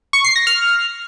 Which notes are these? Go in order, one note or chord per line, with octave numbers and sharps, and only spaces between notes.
C#6
C7
A#6
F6